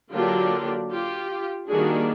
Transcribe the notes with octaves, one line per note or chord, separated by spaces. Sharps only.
D3 F#3 A#3 D4 F4 G4
F4 G4
D#3 G3 A#3 D4 F#4 G#4